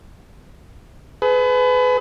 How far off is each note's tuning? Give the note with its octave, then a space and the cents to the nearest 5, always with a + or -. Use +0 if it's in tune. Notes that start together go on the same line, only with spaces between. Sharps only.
G#4 +35 B4 +25